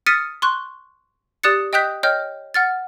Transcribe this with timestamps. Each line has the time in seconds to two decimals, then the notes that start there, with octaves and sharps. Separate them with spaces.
0.06 D#6 F6 A6 B6 C#7 D#7
0.42 C6 C#6 F#6
1.43 G4 D5 D#6 F#6 A6 C#7
1.73 D#5 G5 D#6 F#6 G6 B6
2.03 C#5 D#5 G5 F6 G6
2.54 F#5 F6 A6